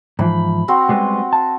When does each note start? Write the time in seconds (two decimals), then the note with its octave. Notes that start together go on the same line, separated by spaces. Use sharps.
0.19 G#2 E3 F3 B5
0.68 C4 F#4 C5
0.89 G3 G#3 B3
1.33 A5